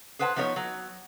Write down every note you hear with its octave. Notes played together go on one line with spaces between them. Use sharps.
G#4 B4 C5 F#5 G5 A5
F3 B3 D#4 A#4 C#5
F#3